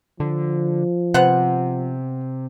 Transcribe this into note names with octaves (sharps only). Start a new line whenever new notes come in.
D3 F3
C3 B3 C5 F#5